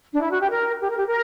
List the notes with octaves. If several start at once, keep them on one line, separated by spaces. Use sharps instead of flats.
D4
E4
F#4
G4
A#4
G4
A#4
G4
A#4